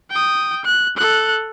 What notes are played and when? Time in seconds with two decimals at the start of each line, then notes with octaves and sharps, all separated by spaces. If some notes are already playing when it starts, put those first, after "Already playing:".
0.11 G5 D#6
0.65 F#6
0.97 A4 F#6